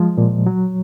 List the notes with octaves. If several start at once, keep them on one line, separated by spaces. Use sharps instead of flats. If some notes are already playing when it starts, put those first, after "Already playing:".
Already playing: F3 G#3
A#2
F#3